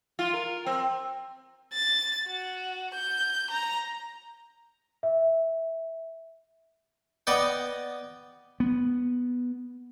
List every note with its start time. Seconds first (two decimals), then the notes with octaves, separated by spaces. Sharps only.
0.19 F4
0.33 A#4
0.66 C4
1.73 A6
2.28 F#4
2.95 G6
3.50 A#5
5.03 E5
7.27 B3 D5 D#5 F#5 G5
8.60 B3